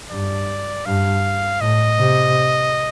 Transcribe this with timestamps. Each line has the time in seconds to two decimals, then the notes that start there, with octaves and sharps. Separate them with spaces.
0.11 G2 D5
0.86 G2 F5
1.61 A2 D#5
1.98 C3